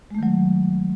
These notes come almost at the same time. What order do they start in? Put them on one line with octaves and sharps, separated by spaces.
G#3 A3 D#3 F#3